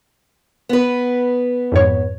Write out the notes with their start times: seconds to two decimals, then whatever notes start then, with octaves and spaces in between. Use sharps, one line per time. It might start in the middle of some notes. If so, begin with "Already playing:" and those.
0.69 B3 B4
1.72 F2 G#2 C#5